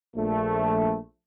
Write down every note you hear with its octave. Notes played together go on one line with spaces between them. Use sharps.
A#1 A3